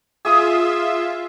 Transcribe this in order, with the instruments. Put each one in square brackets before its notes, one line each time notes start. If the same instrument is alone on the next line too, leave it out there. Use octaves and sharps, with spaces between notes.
[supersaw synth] F4 E5 [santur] G#4 D#6